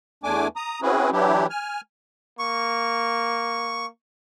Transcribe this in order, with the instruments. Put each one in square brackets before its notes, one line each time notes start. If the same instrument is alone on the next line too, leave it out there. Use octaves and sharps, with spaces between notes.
[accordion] E2 A3 D4 G#5 D6
A#5 D#6
C4 C#4 E4 F#4 G#4 B4
E3 F#3 D4 E4 G4
G#5 F6
[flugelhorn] A#3 [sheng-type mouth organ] C#6